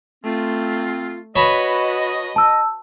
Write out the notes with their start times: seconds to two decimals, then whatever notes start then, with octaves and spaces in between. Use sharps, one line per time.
0.24 A3 C4 F4
1.36 F#4 B4 C#5 D#5 A5 B5
2.36 A5 E6